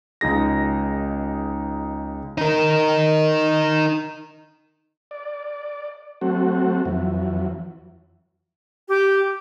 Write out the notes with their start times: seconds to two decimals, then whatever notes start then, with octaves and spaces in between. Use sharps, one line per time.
0.21 C#2 D#4 G#4 A#6
2.38 D#4 A#4
5.11 D5
6.21 F#3 A3 C4 F#4
6.85 F2 E3 F#3
8.88 G4